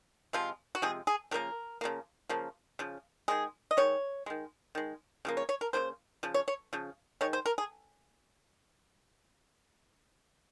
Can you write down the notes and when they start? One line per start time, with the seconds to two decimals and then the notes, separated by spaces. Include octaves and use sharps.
0.33 C3 F3 G#3 F4
0.75 F#4
0.82 C3 F3 G#3 G#4
1.07 G#4
1.31 C#3 F3 A#3 A#4
1.81 C#3 F3 A#3
2.29 C#3 F3 A#3
2.79 C#3 F3
3.28 D#3 G#3 G#4
3.71 D#5
3.77 D#3 G#3 C#5
4.26 D#3 G#3
4.75 D#3 G#3
5.25 C#3 F3 A#3
5.37 C#5
5.49 C#5
5.61 A#4
5.73 C#3 F3 A#3 C5
6.23 C#3 F3
6.34 C#5
6.48 C#5
6.73 C#3 F3
7.21 D#3 G#3 C#5
7.33 C5
7.46 A#4
7.58 G#4